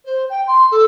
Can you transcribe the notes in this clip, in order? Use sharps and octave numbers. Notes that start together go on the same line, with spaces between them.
C5
G5
C6
A4